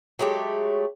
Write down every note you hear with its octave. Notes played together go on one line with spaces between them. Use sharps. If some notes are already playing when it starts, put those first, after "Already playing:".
F#3 G#3 A3 G4